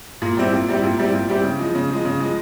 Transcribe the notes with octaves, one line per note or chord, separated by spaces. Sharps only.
A#2
G3 C4 E4 G4
A#2
G3 C4 E4 G4
A#2
G3 C4 E4 G4
A#2
G3 C4 E4 G4
C#3
F3 G#3
C#3
F3 G#3
C#3
F3 G#3